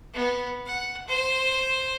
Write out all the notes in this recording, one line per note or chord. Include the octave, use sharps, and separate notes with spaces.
B3
F#5
C5